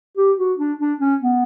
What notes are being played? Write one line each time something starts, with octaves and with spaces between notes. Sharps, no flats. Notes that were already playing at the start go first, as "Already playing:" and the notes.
G4
F#4
D4
D4
C#4
B3